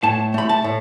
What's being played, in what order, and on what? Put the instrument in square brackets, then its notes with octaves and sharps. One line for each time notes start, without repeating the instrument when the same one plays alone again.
[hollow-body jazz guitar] A2 A5
A3 B5
A5
A2